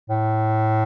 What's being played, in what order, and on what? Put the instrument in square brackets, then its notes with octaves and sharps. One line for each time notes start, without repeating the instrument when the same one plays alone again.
[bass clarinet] A2